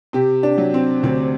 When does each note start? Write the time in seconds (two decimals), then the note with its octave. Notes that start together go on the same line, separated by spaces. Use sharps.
0.13 C3 G4
0.43 D4
0.58 F#3
0.74 C4
1.03 D2 C4